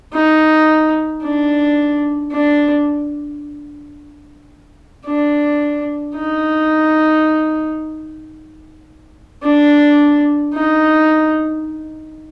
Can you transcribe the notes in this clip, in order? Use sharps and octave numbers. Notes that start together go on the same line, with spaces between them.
D#4
D4
D4
D4
D#4
D4
D#4